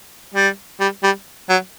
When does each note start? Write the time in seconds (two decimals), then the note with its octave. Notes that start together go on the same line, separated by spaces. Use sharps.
0.35 G3
0.80 G3
1.03 G3
1.50 F#3